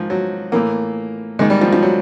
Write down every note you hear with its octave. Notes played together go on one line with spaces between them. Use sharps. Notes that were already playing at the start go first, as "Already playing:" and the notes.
Already playing: G#2 D#3 F3
F#3
A2 E3 A#3
G#2 D#3 G#3
G3
F3
F3
F#3